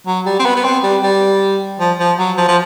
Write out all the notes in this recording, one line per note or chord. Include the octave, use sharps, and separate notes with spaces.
F#3
G3
C4
B3
B3
C4
G3
G3
F3
F3
F#3
F3
F3